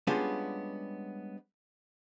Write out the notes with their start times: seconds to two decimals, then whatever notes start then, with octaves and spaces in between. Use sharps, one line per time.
0.07 G3 G#3 B3 C#4 D4 F4